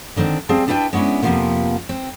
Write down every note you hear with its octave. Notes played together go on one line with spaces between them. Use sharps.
D3 D#3 A#3 C4 D4
G3 C4 G#4 F5 A5
D4 E4 B4 F5 G5 A5
G#3 B3 C#4 D4 E4
F2 C3 D#3 F3 A#3 B3
C4